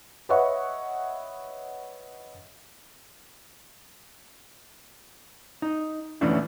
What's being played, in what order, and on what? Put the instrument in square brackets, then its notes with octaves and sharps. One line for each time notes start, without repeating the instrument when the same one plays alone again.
[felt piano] B4 C#5 D#5 E5 F#5 C#6
[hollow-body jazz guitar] D#4
E3 A3 B3 C#4 D4 E4